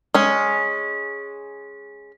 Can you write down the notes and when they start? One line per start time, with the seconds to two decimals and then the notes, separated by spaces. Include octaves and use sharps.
0.15 G#3 C#4